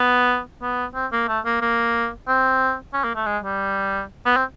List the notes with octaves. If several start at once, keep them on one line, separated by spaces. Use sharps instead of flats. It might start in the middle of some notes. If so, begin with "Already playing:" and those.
Already playing: B3
B3
C4
A#3
A3
A#3
A#3
C4
C#4
A#3
A3
G#3
G3
B3
C4